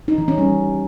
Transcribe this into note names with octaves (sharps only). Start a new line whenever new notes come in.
D#4
E3
C#4
G3